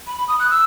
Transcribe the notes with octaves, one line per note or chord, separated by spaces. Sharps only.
B5
B5
D#6
F#6
E6